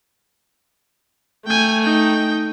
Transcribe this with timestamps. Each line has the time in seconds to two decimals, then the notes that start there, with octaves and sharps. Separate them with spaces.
1.47 A3 G5 G#5
1.81 D#4 G5